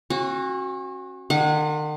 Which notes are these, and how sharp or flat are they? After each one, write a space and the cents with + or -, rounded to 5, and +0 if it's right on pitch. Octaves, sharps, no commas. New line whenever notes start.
C#4 -40 F#4 +0
D#3 -45 F#5 -30